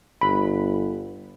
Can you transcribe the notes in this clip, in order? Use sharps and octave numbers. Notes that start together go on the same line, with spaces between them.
G1 B5